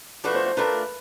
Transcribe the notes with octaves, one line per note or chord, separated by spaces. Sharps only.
F3 A3 D4 F#4 B4
C5
C5
A3 D4 F4 A#4 B4